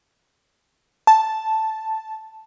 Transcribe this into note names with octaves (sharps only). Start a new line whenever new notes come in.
A5